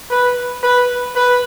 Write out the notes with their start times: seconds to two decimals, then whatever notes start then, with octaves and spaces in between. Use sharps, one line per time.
0.10 B4
0.63 B4
1.16 B4